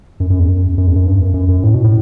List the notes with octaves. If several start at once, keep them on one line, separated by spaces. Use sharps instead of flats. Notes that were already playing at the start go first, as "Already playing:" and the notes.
F#2
F#2
E2
F#2
F#2
E2
F#2
G2
F#2
F#2
F#2
A2
B2
A2